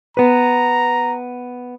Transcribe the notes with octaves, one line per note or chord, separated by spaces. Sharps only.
B3 B4 A#5